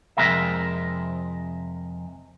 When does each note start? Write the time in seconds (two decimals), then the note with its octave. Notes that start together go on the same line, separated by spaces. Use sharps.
0.17 F2 C3 G#3 A#4 E5